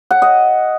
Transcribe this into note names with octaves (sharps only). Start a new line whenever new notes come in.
F#5
D#5